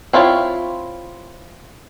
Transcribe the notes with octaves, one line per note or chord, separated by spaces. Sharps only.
C4 E4 F4 A#4 C#5